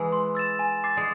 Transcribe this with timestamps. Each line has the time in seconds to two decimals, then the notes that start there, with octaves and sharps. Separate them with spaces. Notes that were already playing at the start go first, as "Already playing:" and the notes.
Already playing: E3 G#3
0.12 C6
0.35 E6 A6 E7
0.59 G#5
0.84 D6 A6 C7
0.97 G#3